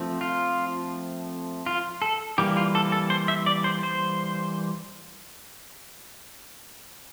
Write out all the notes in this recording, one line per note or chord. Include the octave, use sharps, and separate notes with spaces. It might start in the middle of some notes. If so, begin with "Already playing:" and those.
Already playing: F3 A3 C4
F4
F4
A4
E3 G3 A#3 G4
F4
A4
A4
C5
E5
D5
C5
C5